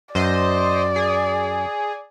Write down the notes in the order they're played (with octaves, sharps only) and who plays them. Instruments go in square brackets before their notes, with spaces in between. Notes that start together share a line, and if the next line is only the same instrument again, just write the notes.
[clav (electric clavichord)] F#2 [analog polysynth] C5 D#5 [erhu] D5
[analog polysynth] G#4